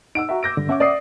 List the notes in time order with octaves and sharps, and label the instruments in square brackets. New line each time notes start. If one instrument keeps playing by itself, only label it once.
[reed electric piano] D#4 F#5 [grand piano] E6 D7
[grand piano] F#4 E5 [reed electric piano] A#5
[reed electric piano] D6 E6 [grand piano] G6 A#6 D7
[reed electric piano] G2 D3
[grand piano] C#4 [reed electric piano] E5 F#5 D6
[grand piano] D5 D#6 C7